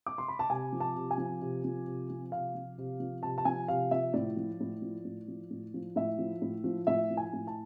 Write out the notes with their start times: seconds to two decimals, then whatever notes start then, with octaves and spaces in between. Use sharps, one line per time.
0.06 D6
0.18 C6
0.28 B5
0.39 A5
0.50 C3 G#5
0.72 F3
0.80 A5
0.96 C3
1.11 G#5
1.18 F3
1.41 C3
1.64 F3
1.87 C3
2.10 F3
2.32 C3 F5
2.55 F3
2.78 C3
3.00 F3
3.23 C3 A5
3.38 A5
3.45 F3 G#5
3.68 C3 F5
3.91 F3 E5
4.14 A2 D5
4.37 F3
4.60 A2
4.82 F3
5.05 A2
5.28 F3
5.50 A2
5.74 F3
5.96 A2 E5
6.18 F3
6.42 A2
6.64 F3
6.87 A2 E5
7.10 F3
7.17 G#5
7.33 A2
7.47 A5